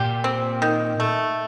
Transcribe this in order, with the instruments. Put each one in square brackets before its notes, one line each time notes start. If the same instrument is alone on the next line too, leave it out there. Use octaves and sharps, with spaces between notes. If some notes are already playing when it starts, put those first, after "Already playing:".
Already playing: [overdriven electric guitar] A#2 [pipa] G4
[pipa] C4
D#3
A3